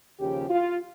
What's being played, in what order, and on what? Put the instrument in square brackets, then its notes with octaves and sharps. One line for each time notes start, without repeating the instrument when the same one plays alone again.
[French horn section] D#2 C#3 F3 G4
F4